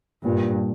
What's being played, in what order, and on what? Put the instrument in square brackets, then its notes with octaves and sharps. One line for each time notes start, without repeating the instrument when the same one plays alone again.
[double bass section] G2 [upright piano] A#2